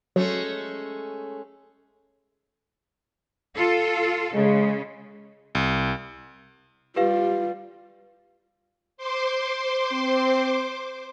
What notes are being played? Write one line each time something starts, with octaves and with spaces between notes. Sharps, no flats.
F#3 G#3 A3 C#4
F4 A4
C#3 G#3
C2
G3 F4 G4 B4 F5
C5 C6 D6
C4